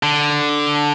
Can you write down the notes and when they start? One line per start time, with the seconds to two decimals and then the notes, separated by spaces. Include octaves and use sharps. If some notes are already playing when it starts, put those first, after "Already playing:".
0.03 D3